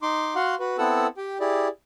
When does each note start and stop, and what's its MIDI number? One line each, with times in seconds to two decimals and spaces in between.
0.02 0.35 63
0.02 0.35 84
0.02 0.35 86
0.35 0.55 66
0.35 0.55 77
0.35 0.55 78
0.35 0.55 84
0.59 0.77 66
0.59 0.77 71
0.78 1.07 59
0.78 1.07 60
0.78 1.07 64
0.78 1.07 69
0.78 1.07 78
0.78 1.07 88
1.17 1.38 67
1.17 1.38 79
1.40 1.68 64
1.40 1.68 67
1.40 1.68 68
1.40 1.68 74